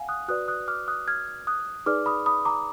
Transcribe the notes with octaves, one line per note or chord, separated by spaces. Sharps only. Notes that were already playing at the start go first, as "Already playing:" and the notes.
Already playing: F5 F#5 G#5
D#6 F#6
F#4 B4 D5 D#6 F#6
D#6 F#6
D6 F6
D#6 F#6
F6 G#6
D#6 F#6
D#4 G#4 B4 D5 D6 F6
B5 D#6
B5 D#6
A#5 D6